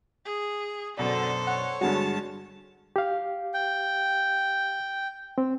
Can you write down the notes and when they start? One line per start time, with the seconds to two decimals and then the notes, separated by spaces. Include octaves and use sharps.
0.25 G#4
0.97 F#2 B2 D3 A4 C5 D5
1.47 C#5 F#5
1.81 G2 D3 G#3 F#4 A5
2.96 G4 F5
3.54 G5
5.38 C4